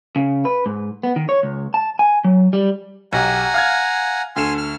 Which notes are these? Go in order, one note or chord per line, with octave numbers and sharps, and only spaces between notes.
C#3
B4
G#2
B3
D#3
C#5
C#2
A5
G#5
F#3
G3
B1 G4 F#5 G#5 A#5
F5 F6 G#6
D2 A4 G#5 C6 F6 E7
F6